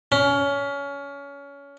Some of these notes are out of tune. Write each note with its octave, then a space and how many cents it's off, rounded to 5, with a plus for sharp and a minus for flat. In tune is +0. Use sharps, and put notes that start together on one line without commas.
C#4 +25